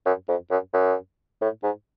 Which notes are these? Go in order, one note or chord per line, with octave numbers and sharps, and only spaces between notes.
F#2
F2
F#2
F#2
A2
G#2